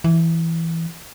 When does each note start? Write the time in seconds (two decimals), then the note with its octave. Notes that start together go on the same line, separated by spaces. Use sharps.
0.04 E3